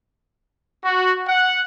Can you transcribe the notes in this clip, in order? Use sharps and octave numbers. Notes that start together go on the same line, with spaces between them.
F#4
F#5